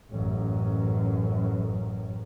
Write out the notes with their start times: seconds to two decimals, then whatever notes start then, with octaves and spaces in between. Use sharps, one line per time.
0.10 A1 F#2